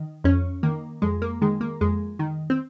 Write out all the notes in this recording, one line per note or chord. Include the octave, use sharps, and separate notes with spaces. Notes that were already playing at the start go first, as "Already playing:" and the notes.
Already playing: D#3
F2 C#4
D#3 A#3
F2 G#3
A#3
D#3 G#3
A#3
F2 G#3
D#3
C4